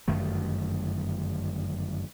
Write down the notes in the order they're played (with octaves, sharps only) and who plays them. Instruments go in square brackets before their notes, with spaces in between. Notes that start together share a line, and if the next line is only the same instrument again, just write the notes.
[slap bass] G1 F#2 D#3 A3